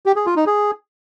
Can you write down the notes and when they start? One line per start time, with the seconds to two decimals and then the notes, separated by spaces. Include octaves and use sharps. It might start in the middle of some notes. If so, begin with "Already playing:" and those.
0.06 G4
0.16 G#4
0.26 F4
0.36 D#4
0.46 G#4